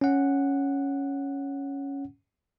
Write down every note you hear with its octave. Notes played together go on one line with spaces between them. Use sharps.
C#4 F#5